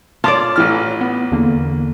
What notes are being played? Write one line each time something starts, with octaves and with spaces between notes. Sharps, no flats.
F4 C#5 D5 A5 D6
A1 E3 F6
B3
E2 D3 A#3